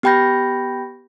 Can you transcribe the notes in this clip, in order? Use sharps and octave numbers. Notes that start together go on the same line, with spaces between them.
B3 G4 G5 B5 G6 A#6